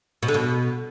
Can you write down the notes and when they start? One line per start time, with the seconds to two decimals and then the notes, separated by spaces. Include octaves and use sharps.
0.23 B2
0.28 D3
0.34 B2